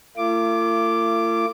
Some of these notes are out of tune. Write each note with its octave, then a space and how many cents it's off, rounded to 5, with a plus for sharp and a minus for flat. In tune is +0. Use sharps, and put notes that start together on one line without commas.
A3 +45 F4 -45 D6 +0